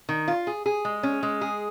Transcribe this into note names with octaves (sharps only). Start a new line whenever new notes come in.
D#3
F4
G#4
G#4
G#3
C#4
G#3
G#4